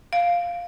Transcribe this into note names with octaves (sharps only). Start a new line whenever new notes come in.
F5